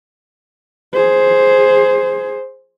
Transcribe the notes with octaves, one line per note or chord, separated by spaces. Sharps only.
G#4 C5